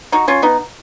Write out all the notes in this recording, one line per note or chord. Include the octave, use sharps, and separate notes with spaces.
D#4 F#4
C#4 F4
B3 D#4